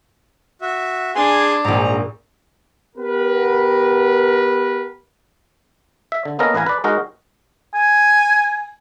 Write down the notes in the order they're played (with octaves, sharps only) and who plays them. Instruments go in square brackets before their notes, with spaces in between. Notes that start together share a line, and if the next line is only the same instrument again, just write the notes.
[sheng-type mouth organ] F#4 E5
[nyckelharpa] D4 [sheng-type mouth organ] G#4 G#5 C6
[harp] A#1 G#2 [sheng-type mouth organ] A#5
[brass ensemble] B3 G4 A#4 B4
[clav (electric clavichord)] E5
D3
A#3 B3 C#4 A4 A#4 D#5
A1 B4 F5 G#5 A#5
B4 D5
G#3 D#4 F#4 A#4
[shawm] G#5